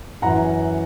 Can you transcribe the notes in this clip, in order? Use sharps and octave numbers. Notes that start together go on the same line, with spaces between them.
F#2 E3 F#5 A#5